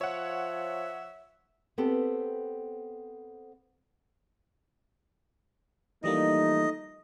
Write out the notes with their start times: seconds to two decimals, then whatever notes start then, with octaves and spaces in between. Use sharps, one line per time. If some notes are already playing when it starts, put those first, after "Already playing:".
0.01 F3 C#5 E5 F#5
1.78 B3 C4 G4 A4 B4
6.04 E3 F3 G3 A3 A#3 D#4 D#5